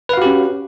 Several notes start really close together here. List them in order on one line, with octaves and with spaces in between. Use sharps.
B4 F5 F#4 G4 C#4